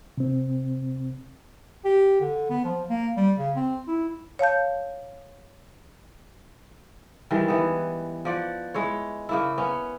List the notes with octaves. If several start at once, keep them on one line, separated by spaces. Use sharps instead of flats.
C3 C4
G4
D3
B3
F3
A#3
G3
C#3
C4
E4
C#5 F5 A5 G6
D#3 E3 G3 G#3
E3 B3
F3 D5 F#5
G#3 E4 C#5
C#3 A#3 E4
B3 C#4